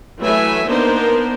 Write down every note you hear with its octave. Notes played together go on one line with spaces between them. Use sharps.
E3 F#3 A3 E5 G#5
A#3 B3 D4 D#4 A#4 C5